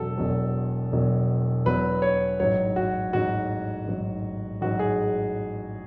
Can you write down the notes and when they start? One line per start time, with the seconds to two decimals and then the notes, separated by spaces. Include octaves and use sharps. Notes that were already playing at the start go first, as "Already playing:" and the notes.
Already playing: E1 E2 B2 F#3 A4
0.18 E1 E2 B2 F#3
0.92 E1 E2 B2 F#3
1.66 E1 E2 B2 F#3 B4
2.02 C#5
2.40 A1 G#2 F#3 C#5
2.76 F#4
3.13 A1 G#2 F#3 F#4
3.87 A1 G#2 F#3
4.61 A1 G#2 F#3 F#4
4.79 G#4